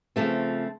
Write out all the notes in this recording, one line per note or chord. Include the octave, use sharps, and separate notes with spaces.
C#3 F3 A3 C4